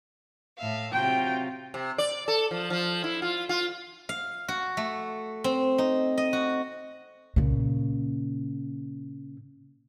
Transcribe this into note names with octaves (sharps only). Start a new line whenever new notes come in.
A2 E5 F5
C3 F#3 F4 G5
C3
D5
A4
F3
F3
E4
F4
F4
F5
F#4
A3
C4
D#4
D#5
F#4
A#2 C#3